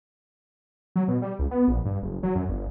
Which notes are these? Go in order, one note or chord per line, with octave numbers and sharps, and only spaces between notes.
F#3
B2
G3
C#2
B3
A#1
G2
F#1
F#3
F#2
G1